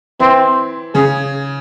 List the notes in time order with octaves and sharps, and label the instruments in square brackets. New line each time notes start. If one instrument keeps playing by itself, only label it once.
[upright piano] E3 E4 [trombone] C4
[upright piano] C#3 C#4 [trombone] G#4